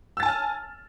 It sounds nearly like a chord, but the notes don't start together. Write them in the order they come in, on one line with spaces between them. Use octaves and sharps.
E6 A6 A5 G#5 F6